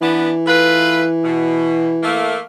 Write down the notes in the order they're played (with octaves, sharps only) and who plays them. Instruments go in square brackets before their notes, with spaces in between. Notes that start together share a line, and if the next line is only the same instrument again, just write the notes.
[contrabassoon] E3 [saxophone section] B3 D4
[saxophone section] A3 F4 B4
B2
A3 A#3